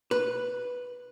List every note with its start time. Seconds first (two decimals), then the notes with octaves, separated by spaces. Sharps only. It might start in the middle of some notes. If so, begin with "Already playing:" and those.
0.11 B4